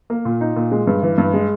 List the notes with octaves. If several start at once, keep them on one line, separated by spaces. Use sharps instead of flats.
A#3
A#2
D#4
A#2
G#3
G2
E3
G2
G#3